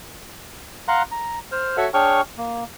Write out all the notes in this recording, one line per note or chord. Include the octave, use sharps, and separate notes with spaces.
F5 F#5 A#5 C6 F#6
A#5
C5 F6
F#4 A4 C#5 E5 F#5
D4 G#4 C#5 G5 C#6 F6
A#3